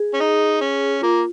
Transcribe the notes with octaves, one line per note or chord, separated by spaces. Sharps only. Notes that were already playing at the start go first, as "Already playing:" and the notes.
Already playing: G#4
C#4
D#4
C#4
A#3 F4